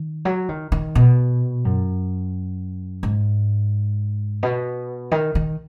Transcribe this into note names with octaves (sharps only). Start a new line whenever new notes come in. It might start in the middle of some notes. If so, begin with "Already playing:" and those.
Already playing: D#3
F#3
D#3
D#3
B2
F#2
G#2
B2
D#3
D#3